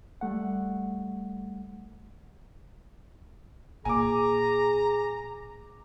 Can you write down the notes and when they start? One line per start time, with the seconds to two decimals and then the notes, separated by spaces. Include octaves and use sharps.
0.21 G3 A3 F#5
3.85 A#2 G#4 G#5 A#5 D6